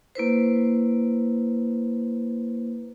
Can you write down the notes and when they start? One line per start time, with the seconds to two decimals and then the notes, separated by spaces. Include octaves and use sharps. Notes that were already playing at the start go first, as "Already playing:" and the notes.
0.15 A#3 E4 B4 C5